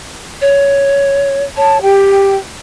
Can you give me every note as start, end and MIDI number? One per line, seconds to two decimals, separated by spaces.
0.41 1.44 73
1.57 1.82 73
1.57 1.82 81
1.82 2.36 67
1.82 2.37 79